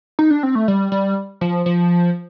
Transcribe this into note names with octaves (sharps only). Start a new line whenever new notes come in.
D#4
D4
C4
A3
G3
G3
F3
F3